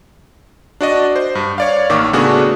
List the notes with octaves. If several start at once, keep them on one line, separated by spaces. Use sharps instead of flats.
D4 F#4 D5 D#5
C5
G2
C#5 D5 F5
A1 D#3 A#3 C#6 D6
C#3 A3 B3 D4 F#4 G#4